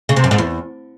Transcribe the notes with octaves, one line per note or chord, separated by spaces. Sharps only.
C#3
C3
F#2
G#2
E2